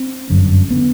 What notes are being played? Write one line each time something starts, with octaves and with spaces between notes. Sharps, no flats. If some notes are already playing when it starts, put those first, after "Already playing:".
Already playing: C4
G1 F#2 D3
D3 B3